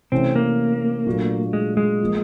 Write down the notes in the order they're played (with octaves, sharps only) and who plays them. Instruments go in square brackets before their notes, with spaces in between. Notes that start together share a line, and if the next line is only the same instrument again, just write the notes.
[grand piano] C3 E3 A3 C#4 [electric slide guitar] C4
[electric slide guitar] A#3
[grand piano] A#2 F#3 A3 D4 F#4
[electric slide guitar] G#3
G#3
[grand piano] F3 A#3